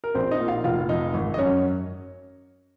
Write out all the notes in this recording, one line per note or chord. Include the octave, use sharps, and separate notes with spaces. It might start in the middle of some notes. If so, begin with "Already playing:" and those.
A#4
A#1 C4 C5
D#4 D#5
A#2
F4 F5
F1 F4 F5
F2 D#4 D#5
G#1
D#5
F#2 C#4 C#5